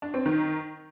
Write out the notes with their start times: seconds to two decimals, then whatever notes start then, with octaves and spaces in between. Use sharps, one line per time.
0.02 D4
0.14 C4
0.26 D#3